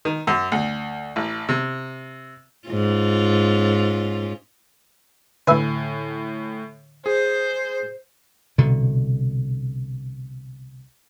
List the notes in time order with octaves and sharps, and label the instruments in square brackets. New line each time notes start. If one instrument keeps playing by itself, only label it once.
[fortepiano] D#3
F#2
D2
A1
C3
[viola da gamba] G#2 C#4 F4
[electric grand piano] A2 G#5 [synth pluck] D3 [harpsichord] B4 E5
[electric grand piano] G#4 [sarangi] C5
[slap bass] C2 B2 D3